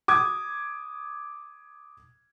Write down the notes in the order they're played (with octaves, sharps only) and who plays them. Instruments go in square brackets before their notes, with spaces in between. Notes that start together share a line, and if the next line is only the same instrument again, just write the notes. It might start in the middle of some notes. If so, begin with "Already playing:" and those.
[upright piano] D6 D#6 G#6